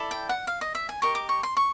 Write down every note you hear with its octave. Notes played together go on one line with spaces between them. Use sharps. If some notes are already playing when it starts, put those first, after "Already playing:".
Already playing: E4 A4 D5
G5
F#5
F5
D#5
E5
G#5
G4 A#4 D#5 C#6
D6
C#6
C6
C#6